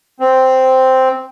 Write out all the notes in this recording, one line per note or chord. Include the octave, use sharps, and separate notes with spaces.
C4